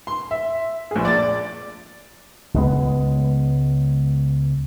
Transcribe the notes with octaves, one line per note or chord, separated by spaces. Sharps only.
C6
E5
A#1 G#4
D5 A6
C#2 G#3 B3